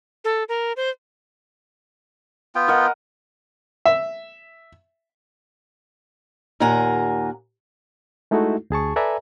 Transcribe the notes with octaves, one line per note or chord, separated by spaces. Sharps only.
A4
A#4
C5
B3 F4 G5
A#4 D#5 F#5
E5
D#2 A#2 F#5 G#5 A#5
G#3 A3 D#4 E4 F#4 A4
D2 G#4 A5 C#6
A4 B4 D5 E5 G#5 A#5